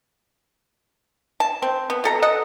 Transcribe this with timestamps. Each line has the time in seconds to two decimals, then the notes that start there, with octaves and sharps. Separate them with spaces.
1.40 A5
1.62 C4
1.90 B3
2.04 B2 A4 A#5
2.22 A4 D#5 F#5